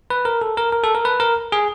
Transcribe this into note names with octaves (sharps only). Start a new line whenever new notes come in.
B4
A#4
A4
A#4
A#4
A4
A#4
B4
A#4
G#4